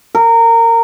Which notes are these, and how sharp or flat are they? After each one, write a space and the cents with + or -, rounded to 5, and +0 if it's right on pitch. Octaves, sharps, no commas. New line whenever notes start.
A#4 -20